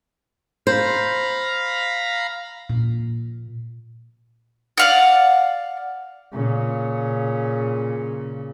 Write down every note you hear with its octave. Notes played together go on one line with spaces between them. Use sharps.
C5 F5 A#5 B5
A#2
D5 F5 F#5
A#2 C#3